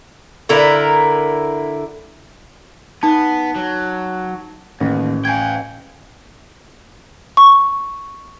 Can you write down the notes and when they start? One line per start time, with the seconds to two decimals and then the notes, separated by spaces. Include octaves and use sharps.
0.49 D3 E4 A#4
3.03 B3 D#4 A5
3.56 F#3
4.80 A1 D#2
5.25 F5 G5 G#5 G#6
7.37 C#6